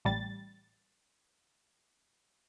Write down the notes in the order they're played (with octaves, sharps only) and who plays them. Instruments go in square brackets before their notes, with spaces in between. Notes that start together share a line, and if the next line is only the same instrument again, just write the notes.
[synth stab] A1 G3 A6